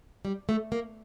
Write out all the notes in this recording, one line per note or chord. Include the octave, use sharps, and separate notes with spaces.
G3
A3
A#3